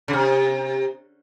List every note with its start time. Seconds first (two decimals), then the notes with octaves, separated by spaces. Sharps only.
0.08 C#3
0.13 C3